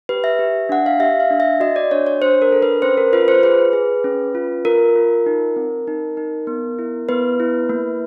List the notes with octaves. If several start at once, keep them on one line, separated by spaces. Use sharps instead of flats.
G4 B4
E5
G4
D4 F#5
F5
G4 E5
F5
D4
E5
F#4 D#5
D5
D4 C#5
C#5
D4 C5
A#4
A4
B4
C#4 C5
A#4
F4 B4
C5
G#4 B4
G#4
C#4
F4
F4 A#4
F4
D#4
C4
D#4
D#4
B3
E4
B3 B4
E4
A#3